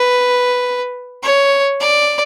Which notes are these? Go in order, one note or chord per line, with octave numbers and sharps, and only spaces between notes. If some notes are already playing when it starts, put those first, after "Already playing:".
Already playing: B4
C#5
D5